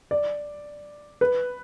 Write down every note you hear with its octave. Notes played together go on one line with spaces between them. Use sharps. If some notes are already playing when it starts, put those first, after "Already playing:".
D5
B4